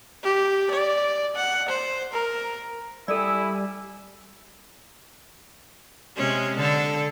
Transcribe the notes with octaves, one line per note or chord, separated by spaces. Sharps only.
G4
D5
F#5
C5
A#4
G3 E4 A4 D5 G#5 E6
C3 G#3 C#4
D3 A4